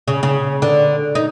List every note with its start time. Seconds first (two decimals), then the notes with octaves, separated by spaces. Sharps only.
0.08 C#3
0.23 C#3
0.62 D3
1.15 D#4